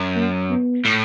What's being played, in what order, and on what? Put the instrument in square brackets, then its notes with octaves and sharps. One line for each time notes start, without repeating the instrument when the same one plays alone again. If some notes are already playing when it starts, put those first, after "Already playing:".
Already playing: [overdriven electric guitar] F#2
[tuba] A#3
B3
[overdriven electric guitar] A2